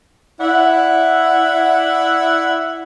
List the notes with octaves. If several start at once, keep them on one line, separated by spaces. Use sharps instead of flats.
E4 D5 E5 F#5